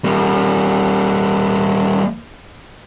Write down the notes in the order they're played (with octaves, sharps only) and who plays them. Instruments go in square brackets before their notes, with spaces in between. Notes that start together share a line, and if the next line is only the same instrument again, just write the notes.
[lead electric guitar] G3 A#3